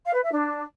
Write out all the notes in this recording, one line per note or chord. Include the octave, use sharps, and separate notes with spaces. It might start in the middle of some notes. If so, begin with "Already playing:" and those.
F5
B4
E5
D4